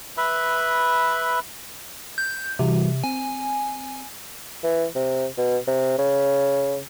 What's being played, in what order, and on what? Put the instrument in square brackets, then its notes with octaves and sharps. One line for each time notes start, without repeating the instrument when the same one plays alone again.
[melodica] B4 E5 B5
[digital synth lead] G6
[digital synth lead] C3 [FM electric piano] E3 G3 F#4
[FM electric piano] C4 [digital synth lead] G#5
[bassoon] E3
C3
B2
C3
C#3